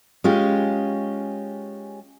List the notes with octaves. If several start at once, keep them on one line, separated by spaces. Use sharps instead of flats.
G#3 C#4 F4 G4